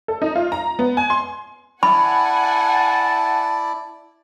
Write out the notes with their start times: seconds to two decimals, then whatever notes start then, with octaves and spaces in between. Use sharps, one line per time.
0.08 A4
0.22 D#4
0.36 F4
0.52 A#5
0.79 B3
0.97 G#5
1.10 C6
1.83 E4 D5 F#5 G#5 A5 B5